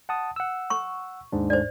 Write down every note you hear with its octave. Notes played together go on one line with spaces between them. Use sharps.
F#5 A5 D#6
F#5 E6
C#6
D#2 G#2 D4
C5 D5